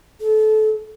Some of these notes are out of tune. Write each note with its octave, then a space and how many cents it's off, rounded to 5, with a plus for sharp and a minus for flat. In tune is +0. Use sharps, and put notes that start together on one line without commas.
A4 -25